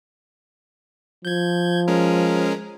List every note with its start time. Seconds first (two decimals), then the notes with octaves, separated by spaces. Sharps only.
1.25 F3 G6 G#6
1.88 G#3 C#4 A#4